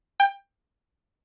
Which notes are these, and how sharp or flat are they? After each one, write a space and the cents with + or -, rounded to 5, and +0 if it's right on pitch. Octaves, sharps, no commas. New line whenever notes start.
G5 +20